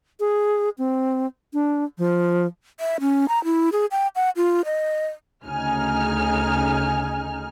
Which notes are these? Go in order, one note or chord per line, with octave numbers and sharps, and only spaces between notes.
G#4
C4
D4
F3
E5
C#4
A#5
E4
G#4
G5
F#5
F4
D#5
D2 C#3 D#4 G#5 F6